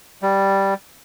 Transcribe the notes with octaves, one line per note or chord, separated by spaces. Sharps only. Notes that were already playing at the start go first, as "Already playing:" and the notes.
G3